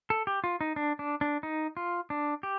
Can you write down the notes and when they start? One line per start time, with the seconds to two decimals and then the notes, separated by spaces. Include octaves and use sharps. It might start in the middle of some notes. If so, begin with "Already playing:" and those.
0.10 A4
0.27 G4
0.44 F4
0.61 D#4
0.76 D4
0.99 D4
1.21 D4
1.43 D#4
1.77 F4
2.10 D4
2.43 G4